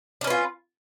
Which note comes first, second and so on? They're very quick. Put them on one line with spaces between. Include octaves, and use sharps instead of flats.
D4 C#4 B4 F4